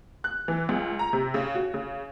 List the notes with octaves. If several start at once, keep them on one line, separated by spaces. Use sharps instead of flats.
F#6
E3
C#2
A#5
C3
C#3
F#4
C#3